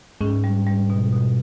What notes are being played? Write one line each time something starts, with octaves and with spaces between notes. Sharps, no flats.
G#2 G#3 C#4
G3
G3
B2
B2